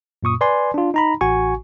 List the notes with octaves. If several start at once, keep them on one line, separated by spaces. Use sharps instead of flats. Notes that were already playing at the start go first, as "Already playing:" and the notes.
F#2 A#2 C#6 D#6
B4 D5 G#5 C6
D4 F4
D#4 A#5 B5
A1 F#4 G#5 C#6